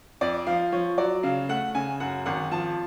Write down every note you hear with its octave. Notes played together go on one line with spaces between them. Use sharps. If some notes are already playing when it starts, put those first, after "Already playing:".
F2 D5
F3 F5
F3 C#5
F#3 D5
C#3 F5
A3 F#5
C#3 G#5
F#2 F#5
G#1 F#5
F3 A5